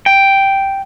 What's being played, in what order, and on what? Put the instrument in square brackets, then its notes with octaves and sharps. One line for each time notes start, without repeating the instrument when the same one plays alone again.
[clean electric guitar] G5